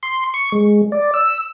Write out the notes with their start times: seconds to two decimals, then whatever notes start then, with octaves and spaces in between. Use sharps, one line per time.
0.03 C6
0.34 C#6
0.52 G#3
0.92 D5
1.14 E6